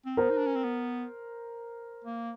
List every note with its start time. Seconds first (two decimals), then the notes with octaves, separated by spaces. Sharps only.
0.06 C4
0.17 B3 A#4 C5
0.30 D#4
0.37 D4
0.46 C#4
0.55 C4
0.64 B3
2.04 A#3